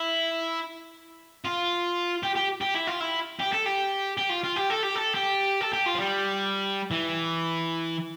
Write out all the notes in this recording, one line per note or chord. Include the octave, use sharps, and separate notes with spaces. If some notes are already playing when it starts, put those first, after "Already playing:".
Already playing: E4
F4
G4
G4
G4
E4
F4
E4
G4
A4
G4
G4
F4
F4
G4
A4
G4
A4
G4
A4
G4
F4
F3
G3
E3